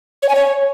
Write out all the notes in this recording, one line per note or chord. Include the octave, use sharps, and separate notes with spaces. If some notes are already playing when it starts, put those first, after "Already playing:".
C#5
G#5
C#5